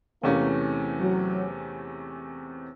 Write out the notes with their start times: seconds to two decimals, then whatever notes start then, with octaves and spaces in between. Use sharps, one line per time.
0.23 E2 C3 E3 A3 A#3 C#4
0.99 F#3